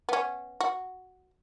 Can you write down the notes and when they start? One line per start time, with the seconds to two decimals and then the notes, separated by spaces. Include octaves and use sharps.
0.09 B3 C#4
0.60 F#4